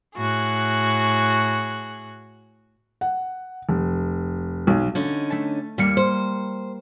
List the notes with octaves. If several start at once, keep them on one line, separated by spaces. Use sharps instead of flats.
A2 F#4 G#4 F#6
F#5
F1
B1
D3 C#4 D#4
A3 A5
D#2 G3 A#3 C#7
C5